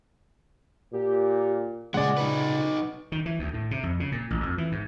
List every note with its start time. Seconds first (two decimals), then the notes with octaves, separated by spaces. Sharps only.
0.93 A#2 G4
1.94 A#2 C#3 G#3 G#4 D5 F#5
2.17 D#4 B4
3.12 D#3
3.26 E3
3.39 D2
3.54 A2
3.71 C3
3.83 F2
4.00 C#3
4.12 A#2
4.30 A1
4.43 F2
4.58 E3
4.72 G#2